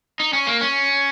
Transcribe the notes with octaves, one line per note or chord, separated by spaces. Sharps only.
D#4
C#4
A#3
C#4